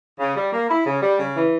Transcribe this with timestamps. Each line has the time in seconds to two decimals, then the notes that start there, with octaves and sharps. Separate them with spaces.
0.19 C#3
0.35 G3
0.52 A#3
0.69 E4
0.86 C#3
1.02 G3
1.19 C#3
1.35 E3